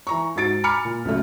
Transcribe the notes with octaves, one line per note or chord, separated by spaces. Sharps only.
E3 A#5 C#6
G#2 F#4 A6 D7
G#5 A#5 B5 D6 F6 C#7
A#2
C#2 F#2 A3